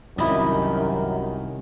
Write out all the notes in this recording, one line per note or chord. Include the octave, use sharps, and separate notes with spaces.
C2 F#2 D#3 E4 G4 D#5